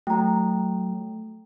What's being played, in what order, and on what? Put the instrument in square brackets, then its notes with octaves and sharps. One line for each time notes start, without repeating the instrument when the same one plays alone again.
[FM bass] F#3 [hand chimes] A3 [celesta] G5 A#5